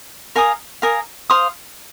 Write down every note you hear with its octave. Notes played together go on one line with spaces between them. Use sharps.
A#4 F5 G#5 D#6
A#4 F5 G#5 D#6
C5 F5 C6 D#6